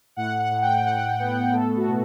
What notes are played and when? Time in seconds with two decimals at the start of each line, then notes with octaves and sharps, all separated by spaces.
0.16 A2 F#5
0.40 F#5
0.51 A2
0.62 G5
0.85 A2 F#5
1.19 B3
1.53 A3 A4
1.76 F#4
1.88 B2